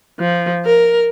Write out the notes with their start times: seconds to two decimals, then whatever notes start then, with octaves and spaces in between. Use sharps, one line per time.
0.20 F3
0.66 A#4